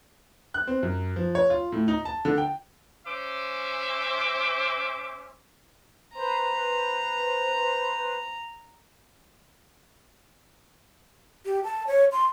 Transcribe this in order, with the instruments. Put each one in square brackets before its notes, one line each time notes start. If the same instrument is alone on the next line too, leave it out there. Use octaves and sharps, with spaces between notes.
[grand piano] F#6
C4
F#2
F3
C#5
F4
A2
D#4
A5
D3
G5
[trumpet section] C#4 C5 E5 D6
[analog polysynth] B4 C5 [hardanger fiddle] A#5
[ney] G4
A5
C#5
C6